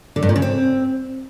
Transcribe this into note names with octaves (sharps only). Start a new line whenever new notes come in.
D3
G2
A#2
C#3
C4